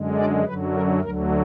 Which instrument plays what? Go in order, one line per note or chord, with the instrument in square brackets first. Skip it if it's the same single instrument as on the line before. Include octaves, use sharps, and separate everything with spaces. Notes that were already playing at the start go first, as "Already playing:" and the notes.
Already playing: [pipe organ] F#2 D3 G#3
D5
F#2 D3 F#3 B4
A#4
D2 D3 F#3 A#4